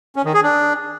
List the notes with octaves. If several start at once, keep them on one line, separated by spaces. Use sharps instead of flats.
C#4
D#3
G#4
D4